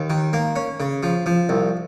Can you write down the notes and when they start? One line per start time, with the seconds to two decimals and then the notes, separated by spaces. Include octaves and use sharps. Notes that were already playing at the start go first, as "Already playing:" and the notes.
Already playing: D#2
0.10 D#3
0.33 A#3
0.56 C#4
0.80 C#3
1.03 F3
1.26 F3
1.49 C2